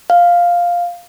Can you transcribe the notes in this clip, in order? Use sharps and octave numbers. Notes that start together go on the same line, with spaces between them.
F5